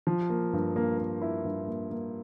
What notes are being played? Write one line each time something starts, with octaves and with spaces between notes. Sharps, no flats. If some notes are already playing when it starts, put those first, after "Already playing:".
F3
A#3
G2
A#3
A#3
E4
G2
A#3
A#3